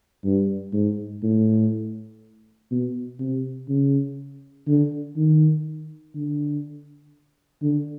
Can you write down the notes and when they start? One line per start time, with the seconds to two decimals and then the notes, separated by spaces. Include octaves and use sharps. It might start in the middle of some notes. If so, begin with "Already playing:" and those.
0.25 G2
0.73 G#2
1.23 A2
2.71 B2
3.19 C3
3.69 C#3
4.67 D3
5.16 D#3
6.15 D3
7.62 D3